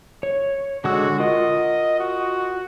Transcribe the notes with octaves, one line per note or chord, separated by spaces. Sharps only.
C#5
D3 G#3 F#4 E6
F4 A#4 D#5 F#5
F#4